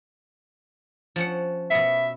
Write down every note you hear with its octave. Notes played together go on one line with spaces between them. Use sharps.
F3 C#4 F#5
B2 B3 E5